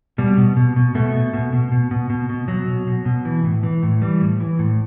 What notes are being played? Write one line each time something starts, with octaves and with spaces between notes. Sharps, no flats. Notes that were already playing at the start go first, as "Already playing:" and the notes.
B2 G3
B2
B2
B2
B2 A3
B2
B2
B2
B2
B2
B2
B2
B2 F#3
B2
B2
B2
E3
A2
E3
A2
E3 G3
A2
E3
A2